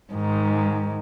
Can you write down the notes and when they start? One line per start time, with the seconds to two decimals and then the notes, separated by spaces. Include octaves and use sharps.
0.14 G#2 D#3